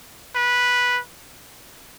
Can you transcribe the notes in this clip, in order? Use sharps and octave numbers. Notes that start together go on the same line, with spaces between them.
B4